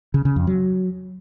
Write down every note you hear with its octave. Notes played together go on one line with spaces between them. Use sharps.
C#3
C#3
F2
F#3